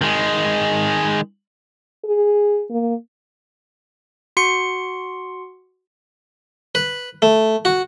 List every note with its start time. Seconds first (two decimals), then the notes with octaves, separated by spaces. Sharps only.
0.01 D#3 G#3
2.04 G#4
2.70 A#3
4.37 F#4 C6 C#7
6.75 B4
7.22 A3
7.65 F#4